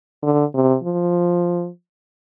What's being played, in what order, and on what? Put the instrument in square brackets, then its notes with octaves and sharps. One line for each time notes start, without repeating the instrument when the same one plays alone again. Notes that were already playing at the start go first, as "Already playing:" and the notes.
[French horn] D3
C3
F3